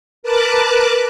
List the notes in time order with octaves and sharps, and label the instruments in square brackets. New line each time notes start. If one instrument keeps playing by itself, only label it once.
[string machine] A#4 B4 A5 D6 F#6